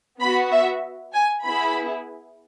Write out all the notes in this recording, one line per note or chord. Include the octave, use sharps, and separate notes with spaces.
B3 F#4 B5
E5
G#5
B3 E4 G#4 B5